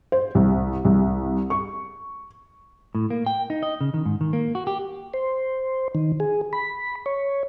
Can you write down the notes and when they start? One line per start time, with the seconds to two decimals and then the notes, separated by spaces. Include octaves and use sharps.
0.12 C5
0.35 C2
0.85 C2
1.50 C#6
2.95 A2
3.10 A#3
3.26 G5
3.50 D#4
3.63 D#5
3.81 C#3
3.94 D#3
4.05 G#2
4.21 D#3
4.33 A#3
4.55 F#4
4.67 G4
5.14 C5
5.95 D#3
6.20 G#4
6.53 B5
7.06 C#5